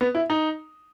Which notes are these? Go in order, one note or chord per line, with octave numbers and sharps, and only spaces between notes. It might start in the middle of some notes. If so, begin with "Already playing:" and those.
B3
E4
D#4